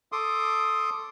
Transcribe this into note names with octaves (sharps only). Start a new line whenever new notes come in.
A4 C6 D6 D#6